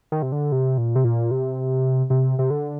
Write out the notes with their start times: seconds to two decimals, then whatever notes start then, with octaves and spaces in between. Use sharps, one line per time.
0.12 D#3
0.22 C3
0.32 D3
0.52 C3
0.78 A#2
0.96 C3
1.04 A#2
1.31 C3
2.10 C3
2.39 C3
2.50 D3